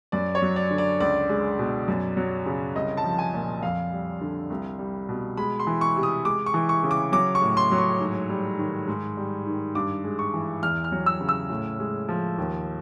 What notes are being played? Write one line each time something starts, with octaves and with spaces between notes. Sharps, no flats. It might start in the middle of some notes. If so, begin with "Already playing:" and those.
F#2 D5
C#5
F#3
D5
D3
D5
C#2 D5
G#3
B2
F#2
F#3
C#3
C2 D#5
A5
F3
G#5
A#2
F2 F5
G3
D3
C2
G3
B2
G#3 B5
C6
E3
C#6
C3
D#6
G#3 D6
C#6
E3
C#6
C#3
D6
F#3 D6
C#6
A2
C6
F#3
C#6
G#2
G3
D#3
G#2
G3
D#3
G2 D6
G#3
C#6
E3
E2 F6
F6
F#3
E6
C#3
E6
A2
G#3
F3
D#2